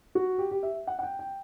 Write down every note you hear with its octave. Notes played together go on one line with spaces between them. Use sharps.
F#4
G4
G4
E5
F#5
F#5
G5
G5